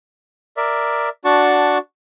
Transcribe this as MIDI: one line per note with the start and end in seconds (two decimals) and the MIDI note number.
0.57 1.09 70
0.57 1.09 74
0.57 1.09 76
1.25 1.78 62
1.25 1.78 66
1.25 1.78 78
1.25 1.78 81
1.25 1.78 85